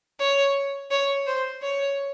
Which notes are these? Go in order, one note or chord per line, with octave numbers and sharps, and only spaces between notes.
C#5
C#5
C5
C#5